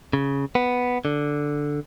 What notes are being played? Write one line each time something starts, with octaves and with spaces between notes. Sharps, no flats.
C#3
B3
D3